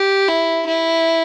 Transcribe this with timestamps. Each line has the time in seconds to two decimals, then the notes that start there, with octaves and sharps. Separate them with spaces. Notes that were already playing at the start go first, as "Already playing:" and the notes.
Already playing: G4
0.28 E4
0.67 E4